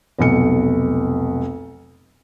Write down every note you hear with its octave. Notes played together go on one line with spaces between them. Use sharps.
F1 B1 C#7